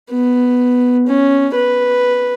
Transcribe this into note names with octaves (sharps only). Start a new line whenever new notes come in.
B3
C#4
B4